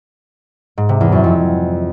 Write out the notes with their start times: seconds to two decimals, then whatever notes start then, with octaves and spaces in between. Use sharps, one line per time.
0.78 G#2
0.89 C3
1.01 E2
1.12 F#2
1.24 F2